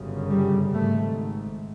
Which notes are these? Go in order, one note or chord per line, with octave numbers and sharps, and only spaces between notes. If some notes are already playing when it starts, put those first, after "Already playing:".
Already playing: G1 F#2 C#3
G3
G#1 G#2 A3